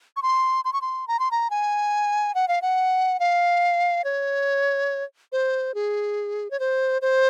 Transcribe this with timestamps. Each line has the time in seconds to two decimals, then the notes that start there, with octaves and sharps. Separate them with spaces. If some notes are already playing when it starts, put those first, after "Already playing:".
0.16 C#6
0.22 C6
0.65 C6
0.73 C#6
0.82 C6
1.08 A#5
1.19 C6
1.31 A#5
1.50 G#5
2.35 F#5
2.48 F5
2.62 F#5
3.20 F5
4.04 C#5
5.32 C5
5.74 G#4
6.51 C#5
6.60 C5
7.02 C5